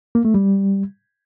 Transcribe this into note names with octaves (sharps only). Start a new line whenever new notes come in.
A#3
A3
G3